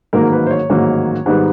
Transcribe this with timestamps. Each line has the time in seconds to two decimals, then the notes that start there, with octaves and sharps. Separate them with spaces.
0.13 A1 G#2 D#3 F#3 A#3 A#4
0.32 B4
0.46 C5
0.51 C#5
0.70 A1 G#2 D#3 F#3 A#3
1.26 G#2 D#3 G3 B3